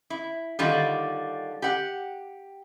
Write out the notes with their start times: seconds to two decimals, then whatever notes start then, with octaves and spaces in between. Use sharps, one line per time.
0.10 E4
0.59 D3 D#3 G3 D4 F4
1.62 G4 F#5